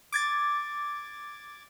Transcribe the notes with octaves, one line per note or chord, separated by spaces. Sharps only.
D6 G#6 A6